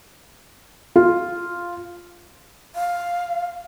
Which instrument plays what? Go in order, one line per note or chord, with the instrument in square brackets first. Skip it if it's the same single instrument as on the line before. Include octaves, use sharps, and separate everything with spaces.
[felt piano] F4
[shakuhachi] F5